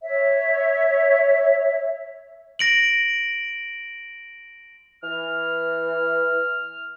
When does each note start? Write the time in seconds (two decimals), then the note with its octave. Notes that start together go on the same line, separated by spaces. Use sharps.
0.03 C#5 E5
2.59 A#6 D7 F#7
5.03 E3 F6